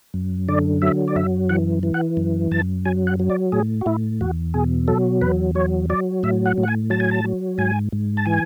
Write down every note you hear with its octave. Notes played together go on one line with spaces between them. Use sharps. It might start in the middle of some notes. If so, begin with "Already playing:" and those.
F#2
D3 D5
F#3 E5
D5
F#2 E5
E3 F#5
E3
F#5
F#2
F#2 A5
F#3 G#5
F#5
F#3
D5
A2 G#4
F#4
A2 E4
E2 F#4
B2 G#4
F#3 A4
E2 B4
F#3 C#5
F#3 D5
A2 E5
F#5
A2
F#5
G#5
F#3 A5
G#5
A5
F#3
G#2 G#5
G#2
A5
E3 G#5